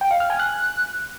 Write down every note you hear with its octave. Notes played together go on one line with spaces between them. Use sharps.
G5
F5
F6
G#5
F#6